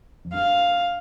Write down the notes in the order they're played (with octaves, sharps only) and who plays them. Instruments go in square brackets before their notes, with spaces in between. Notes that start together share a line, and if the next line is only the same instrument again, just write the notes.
[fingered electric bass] F2
[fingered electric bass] G2 [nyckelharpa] F5